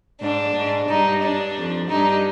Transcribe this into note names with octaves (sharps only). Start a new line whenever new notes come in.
G#2 D4
G#2
G2 D#4
D4
F2
G2 D#4